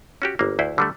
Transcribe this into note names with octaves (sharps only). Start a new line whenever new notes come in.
C#4 F#4 G4
G1 A#3
D2 E4 B4 C5
D3 G3 A3